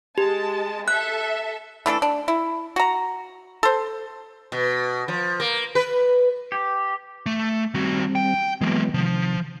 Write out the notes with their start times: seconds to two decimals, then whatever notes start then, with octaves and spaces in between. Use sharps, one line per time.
0.18 G#3 G4 A5
0.88 A4 E5 F#6
1.86 E3 A3 D4 A4
2.02 D4
2.28 E4
2.76 F#4 A#5
3.63 A4 C5
4.52 B2
5.08 F3
5.40 A#3
5.75 B4
6.52 G4
7.26 A3
7.74 D#3 G3 C4 F#4
8.15 G5
8.61 E3 F#3 G#3 A#3 B3
8.94 C3 D#3 F3